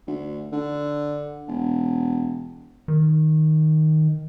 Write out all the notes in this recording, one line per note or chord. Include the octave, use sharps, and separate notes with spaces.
D2
D3
E1
D#3